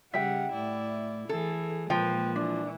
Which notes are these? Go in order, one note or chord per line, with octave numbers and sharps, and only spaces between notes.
C#3 G3 E5 F#5 G5
A2 E4 D5
E3 G#4 A4
A#2 F3 G#3 A#3 B4 G5
E3 D4